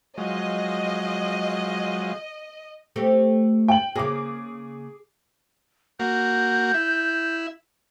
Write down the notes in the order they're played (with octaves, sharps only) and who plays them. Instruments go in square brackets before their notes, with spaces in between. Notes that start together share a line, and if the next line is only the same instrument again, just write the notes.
[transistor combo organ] F3 F#3 G#3 [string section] D#5
[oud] A3 C4 G4
[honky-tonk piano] G5 F#7
[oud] C#3 A#3 [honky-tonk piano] G#4 D6
[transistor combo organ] A#3 F#4 [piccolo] G6
[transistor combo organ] E4